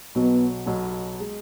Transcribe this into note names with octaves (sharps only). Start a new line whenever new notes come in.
B1 B2 F#3 B3
B1 B2 F#3
G#3